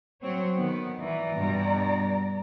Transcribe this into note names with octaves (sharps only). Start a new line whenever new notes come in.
F#3 C4 C#5
D#3 B3
E3 D5 A#5
G2 B2